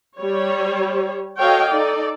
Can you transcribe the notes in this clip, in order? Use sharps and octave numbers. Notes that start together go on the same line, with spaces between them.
G3 C#5
F#4 A4 C#5 D#5 F5 G5
D#4 A4 D5